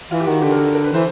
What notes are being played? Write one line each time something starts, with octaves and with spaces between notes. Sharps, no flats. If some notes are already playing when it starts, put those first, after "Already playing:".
E3 F4
G4
D#3 F#4
D3 G4
A#4
A4
A#4
B4
E3 C5